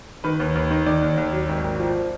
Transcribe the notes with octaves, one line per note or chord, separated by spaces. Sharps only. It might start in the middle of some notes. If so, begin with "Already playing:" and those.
D#3 B4
D#2
D#2
D#3
D#3 D5
D#2
D#2
F#3
G#1
G#1
F3